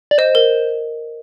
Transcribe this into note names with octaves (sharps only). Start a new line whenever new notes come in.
D5
C5 D#5
A#4